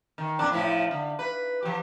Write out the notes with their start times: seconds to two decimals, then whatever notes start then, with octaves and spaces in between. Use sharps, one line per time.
0.18 D#3
0.39 F2 A#2 D4
0.51 A2 F3 E4
0.91 D3
1.19 B4
1.63 F3 G4